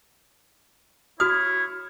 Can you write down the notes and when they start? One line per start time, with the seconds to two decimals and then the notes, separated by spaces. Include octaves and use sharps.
1.20 E4 F#4 C#5 D#6 F6